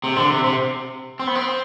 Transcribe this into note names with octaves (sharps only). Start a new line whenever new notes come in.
C3
D3
C3
C3
C4
B3
C4